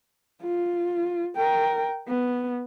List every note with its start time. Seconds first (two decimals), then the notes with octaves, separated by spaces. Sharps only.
0.43 F4
1.36 A#4 G5
2.08 B3